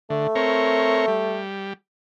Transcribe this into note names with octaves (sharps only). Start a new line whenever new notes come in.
D3 A3
C4 A#4 C#5
G3